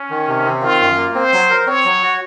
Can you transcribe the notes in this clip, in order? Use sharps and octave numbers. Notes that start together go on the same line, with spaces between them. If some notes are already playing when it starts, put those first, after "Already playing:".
Already playing: C#4
D#3
C3
C4
D#3 F4
F#2
A#3
C4 C5
F#3
A#4
C4 C#5
F#3
F#4